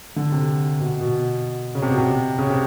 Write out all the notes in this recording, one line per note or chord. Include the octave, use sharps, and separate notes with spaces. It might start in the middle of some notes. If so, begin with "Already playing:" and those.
D3
C3
B2
B2
C#3
C3
B2
C3
C#3
C3